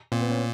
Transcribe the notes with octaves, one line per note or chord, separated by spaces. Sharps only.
A#2 C4
B3
C#4